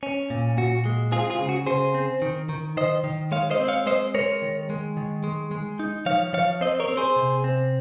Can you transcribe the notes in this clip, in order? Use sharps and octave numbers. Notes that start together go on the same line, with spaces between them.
C#4
A#2
A#2 F#4
G#3
C4 F4 G#4
F4 G#4
C#3
F#4
C#3 G#4 C5
C4
D#3
D#3
D#3 C5 D#5
D#3
G#3 C#5 F5
C5 D#5
C4
C#5 F5
G#3 C5 D#5
G#3 A#4 C#5
D#3
G#3
D#3
G#3
G#3
D#4
F3 C#5 F5
F3 C#5 F5
C4 C5 D#5
A#4 C#5
C4
G#4 C5
C3
C4